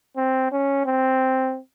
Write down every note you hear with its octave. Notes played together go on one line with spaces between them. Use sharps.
C4
C#4
C4